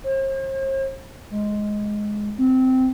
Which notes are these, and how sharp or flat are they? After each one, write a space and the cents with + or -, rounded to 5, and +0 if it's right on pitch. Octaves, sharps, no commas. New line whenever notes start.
C5 +45
G#3 +5
C4 -15